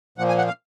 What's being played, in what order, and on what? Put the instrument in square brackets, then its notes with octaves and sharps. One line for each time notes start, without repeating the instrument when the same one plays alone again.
[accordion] A#2 F3 A#3 F#5
G#5
F#5
F5